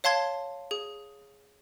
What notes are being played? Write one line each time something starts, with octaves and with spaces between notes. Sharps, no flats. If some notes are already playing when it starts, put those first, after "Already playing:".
C#5 F5 A5 C6 G#6
G#4